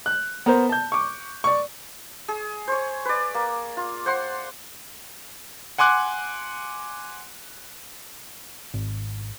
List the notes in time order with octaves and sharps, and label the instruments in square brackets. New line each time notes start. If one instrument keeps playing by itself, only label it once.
[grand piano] F#6
B3 A#4 C5
A5 G6
C#6 D6
D5 C#6
[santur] G#4
C5 C#5
B4 D5
A#3
F4
C5 F#5 C6
[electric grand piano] F#5 G#5 C6 D6 F#6
[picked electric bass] G#1